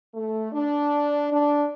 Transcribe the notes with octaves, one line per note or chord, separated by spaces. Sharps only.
A3
D4
D4